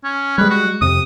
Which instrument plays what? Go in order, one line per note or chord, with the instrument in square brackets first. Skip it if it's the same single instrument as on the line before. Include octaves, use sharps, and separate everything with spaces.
[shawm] C#4
[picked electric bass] G3 G#3 [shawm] B4
[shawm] F#4
[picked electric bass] F2 C3 [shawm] D#6